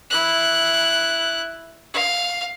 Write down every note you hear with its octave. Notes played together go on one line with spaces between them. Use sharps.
E4 F#6
F5